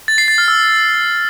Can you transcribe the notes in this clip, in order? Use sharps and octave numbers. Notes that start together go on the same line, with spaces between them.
A6
C7
A6
F6
E6